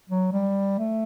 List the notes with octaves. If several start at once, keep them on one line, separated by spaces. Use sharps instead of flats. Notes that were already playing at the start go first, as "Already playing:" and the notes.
F#3
G3
A3